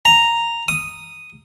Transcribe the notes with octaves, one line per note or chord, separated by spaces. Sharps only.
A#5
D#6